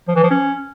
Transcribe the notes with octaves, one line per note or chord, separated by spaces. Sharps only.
F3
E3
F3
C#4